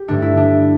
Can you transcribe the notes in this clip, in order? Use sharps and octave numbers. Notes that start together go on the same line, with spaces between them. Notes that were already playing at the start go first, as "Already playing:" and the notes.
Already playing: G4
G2 D3 A3 D4
E4
D4